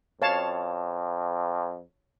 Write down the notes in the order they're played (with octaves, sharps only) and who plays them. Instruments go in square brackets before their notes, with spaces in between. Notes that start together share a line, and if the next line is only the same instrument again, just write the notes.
[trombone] F2 [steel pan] C#5 F5 A5